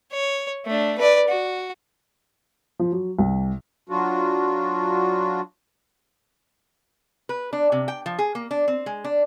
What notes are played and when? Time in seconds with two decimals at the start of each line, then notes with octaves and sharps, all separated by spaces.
0.13 C#5
0.66 A3 D4
0.98 B4 D5
1.29 F#4
2.79 F3
2.92 F#3
3.19 C2
3.89 F#3 D4 F4 F#4
7.29 B4
7.53 D4
7.72 C3
7.88 G5
8.06 F3
8.19 G#4
8.35 A#3
8.51 D4
8.68 C4
8.86 G#3
9.04 D4